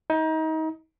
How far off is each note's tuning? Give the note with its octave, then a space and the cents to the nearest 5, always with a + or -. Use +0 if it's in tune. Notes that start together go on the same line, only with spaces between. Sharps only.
D#4 +30